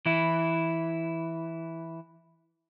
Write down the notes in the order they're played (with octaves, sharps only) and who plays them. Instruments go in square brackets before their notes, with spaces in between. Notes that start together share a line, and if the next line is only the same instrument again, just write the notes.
[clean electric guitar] E3 E4